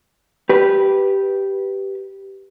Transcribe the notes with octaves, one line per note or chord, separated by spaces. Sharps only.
G4 B4